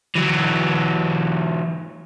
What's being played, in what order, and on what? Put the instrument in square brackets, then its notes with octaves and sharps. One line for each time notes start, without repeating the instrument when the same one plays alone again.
[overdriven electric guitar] E3 F#3